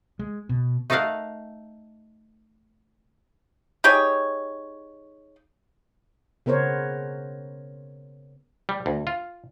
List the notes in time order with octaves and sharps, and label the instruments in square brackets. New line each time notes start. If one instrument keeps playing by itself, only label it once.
[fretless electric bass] G#3
B2
[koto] A3 D#4 A4 A#4 F5 F#5
[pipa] D#4 G4 G#4 C#5
[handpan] C#3 B3 A#4 C5 C#5
[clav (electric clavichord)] G3
D2
F4